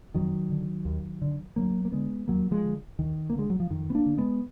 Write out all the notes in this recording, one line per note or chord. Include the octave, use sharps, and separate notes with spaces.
F2 D#3 F#3
D3
D#2
D3
D2 F#3 A#3
A#3
D3 G#3 B3
D#2 F#3 A#3
F3 G#3
D3
D#2 D#3
A#3
D3 G#3
F#3
F3
F2 D#3
B3
A#3 D4
D3
G#3 B3